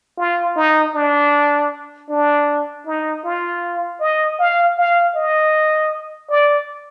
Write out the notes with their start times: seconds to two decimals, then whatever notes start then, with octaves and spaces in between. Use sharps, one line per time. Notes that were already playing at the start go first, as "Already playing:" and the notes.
0.18 F4
0.56 D#4
0.94 D4
2.09 D4
2.86 D#4
3.25 F4
4.00 D#5
4.39 F5
4.77 F5
5.16 D#5
6.30 D5